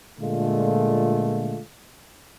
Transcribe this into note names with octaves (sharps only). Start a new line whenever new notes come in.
A#2 D3 G#3 A3 F4